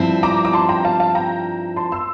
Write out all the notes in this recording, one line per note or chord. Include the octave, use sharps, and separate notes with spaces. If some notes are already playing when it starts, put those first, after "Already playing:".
Already playing: G2 F3 C4 E4
A#5 D6
D6
A5 C6
G5 A#5
F5 A5
F5 A5
G5 A#5
A5 C6
C6 E6